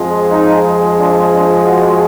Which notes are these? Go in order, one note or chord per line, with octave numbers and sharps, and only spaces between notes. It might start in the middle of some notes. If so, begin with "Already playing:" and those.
Already playing: F2 F3 G#3
D#4
D4
D4
F#4